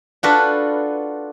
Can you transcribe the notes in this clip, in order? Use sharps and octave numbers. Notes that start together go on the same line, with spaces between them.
D4 F4 F#4 A4 B4